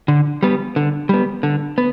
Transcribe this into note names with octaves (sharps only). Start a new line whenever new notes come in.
D3
G3 B3
D3
G3 B3
D3
B3